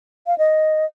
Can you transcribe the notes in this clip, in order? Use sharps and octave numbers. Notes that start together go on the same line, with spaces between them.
F5
D#5